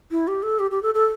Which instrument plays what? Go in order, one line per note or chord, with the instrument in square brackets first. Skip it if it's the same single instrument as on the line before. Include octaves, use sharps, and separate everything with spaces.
[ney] E4
G4
A4
G4
G4
A4
A4